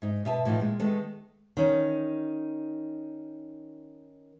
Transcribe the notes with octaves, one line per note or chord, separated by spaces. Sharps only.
G#2 D#4
B2 E5 G#5 A5
A2 E3 F3 A3 D#4
A#2 G#3
D#3 G#3 A3 B3 A4
D#3 C#4 D#4